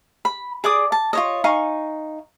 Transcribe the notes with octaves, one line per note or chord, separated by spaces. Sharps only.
B5
G#4 D5 D6 D#6
A5
F4 C#5 D#5
D#4 F5 G#5 C#6